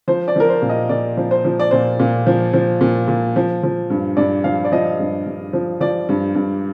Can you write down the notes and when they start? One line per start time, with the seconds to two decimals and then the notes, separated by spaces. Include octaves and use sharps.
0.08 F3 C5
0.28 D5
0.36 F3 A#4
0.49 C5
0.62 A#2
0.69 D#5
0.89 A#2 D5
1.17 F3
1.31 C5
1.45 F3
1.60 D5
1.71 A#2 C5
2.00 A#2
2.27 F3
2.53 F3
2.81 A#2
3.08 A#2
3.36 F3
3.63 F3
3.90 G2
4.17 G2 D5
4.44 F3 F5
4.65 D5
4.72 F3 D#5
5.00 G2
5.26 G2
5.53 F3
5.80 F3 D5
6.09 G2
6.35 G2